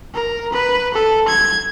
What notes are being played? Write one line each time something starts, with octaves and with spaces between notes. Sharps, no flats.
A#4
B4
A4
G#6